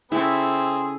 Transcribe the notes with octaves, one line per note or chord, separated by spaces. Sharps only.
C#3 C4 E4 G#4 A4